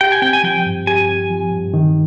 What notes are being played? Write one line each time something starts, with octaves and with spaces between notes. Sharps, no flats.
G4 G5
G#5
C4 G5
G#5
F3 G5
G2
G4 G#5
C4
F3
G2
D#3